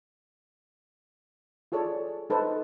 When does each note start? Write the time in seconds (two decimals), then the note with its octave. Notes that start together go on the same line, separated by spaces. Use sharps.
1.72 F4 G#4 A4 C#5 D5
2.30 D#4 A4 B4 C5